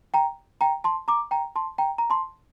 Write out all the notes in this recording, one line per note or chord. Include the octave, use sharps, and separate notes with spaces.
G5 A#5
G5 A#5
A5 C6
A#5 D6
G5 A#5
A5 C6
G5 A#5
A#5
A5 C6